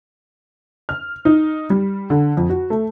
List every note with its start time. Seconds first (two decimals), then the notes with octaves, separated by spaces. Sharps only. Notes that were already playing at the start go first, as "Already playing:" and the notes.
0.89 F6
1.25 D#4
1.70 G3
2.10 D3
2.37 F2
2.50 F#4
2.70 A3